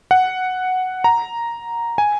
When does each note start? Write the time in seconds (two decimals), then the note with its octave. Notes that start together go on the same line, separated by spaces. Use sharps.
0.11 F#5
1.04 A#5
1.98 G#5